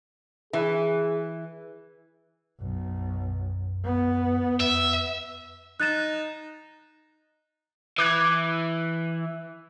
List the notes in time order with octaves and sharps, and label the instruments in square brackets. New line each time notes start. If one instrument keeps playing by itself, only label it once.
[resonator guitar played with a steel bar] E3 [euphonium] G#4
[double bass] B1 [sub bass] F#2
[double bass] B3
[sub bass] F2 [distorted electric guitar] E5
[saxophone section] D#4 [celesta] F#6 A6 E7
[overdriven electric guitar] E3 [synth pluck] D6 F#6 G#6